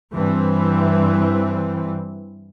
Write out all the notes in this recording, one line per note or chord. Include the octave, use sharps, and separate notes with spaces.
G2 E3 C4